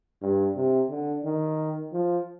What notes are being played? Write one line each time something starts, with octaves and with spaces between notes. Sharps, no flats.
G2
C3
D3
D#3
F3